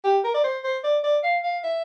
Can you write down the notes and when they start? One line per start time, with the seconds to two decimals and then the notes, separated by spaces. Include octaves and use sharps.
0.04 G4
0.24 A#4
0.34 D5
0.44 C5
0.64 C5
0.84 D5
1.04 D5
1.23 F5
1.43 F5
1.64 E5